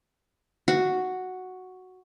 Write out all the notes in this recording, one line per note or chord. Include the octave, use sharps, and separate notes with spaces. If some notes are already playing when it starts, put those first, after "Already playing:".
F#4